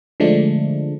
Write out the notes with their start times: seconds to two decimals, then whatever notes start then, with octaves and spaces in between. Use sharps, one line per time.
0.20 D3 F3 G#3 A3 D4